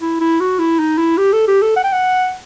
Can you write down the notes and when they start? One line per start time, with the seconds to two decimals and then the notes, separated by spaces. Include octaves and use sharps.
0.01 E4
0.20 E4
0.40 F#4
0.59 E4
0.79 D#4
0.98 E4
1.17 G4
1.33 A4
1.48 G4
1.62 A4
1.76 F#5
1.84 G5
1.92 F#5